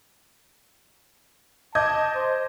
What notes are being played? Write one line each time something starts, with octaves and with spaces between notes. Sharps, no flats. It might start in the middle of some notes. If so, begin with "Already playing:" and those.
D#5 A5 D6 G6 G#6
C5